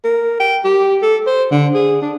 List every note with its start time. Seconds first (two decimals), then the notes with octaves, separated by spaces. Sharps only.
0.04 A#4
0.40 G5
0.64 G4
1.02 A4
1.27 C5
1.51 D3
1.74 G#4
2.02 D4